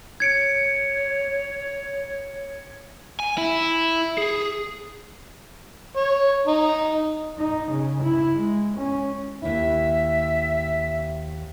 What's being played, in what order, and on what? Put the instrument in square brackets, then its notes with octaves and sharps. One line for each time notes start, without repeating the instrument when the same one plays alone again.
[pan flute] C#5 [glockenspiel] G#6 C#7 D7
[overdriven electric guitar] G#5
E4
G#4
[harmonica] C#5
D#4
[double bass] D#4
C#3
E4
G#3
C#4
[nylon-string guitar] D#2 E4 [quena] E5